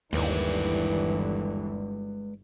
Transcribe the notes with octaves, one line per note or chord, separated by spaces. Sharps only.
G1 D#2 E3 G#3 B4 D5